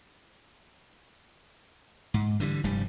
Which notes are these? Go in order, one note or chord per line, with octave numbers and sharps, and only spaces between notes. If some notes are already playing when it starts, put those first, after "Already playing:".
G#2
D3 E3 F3 G3
F1 G2 G3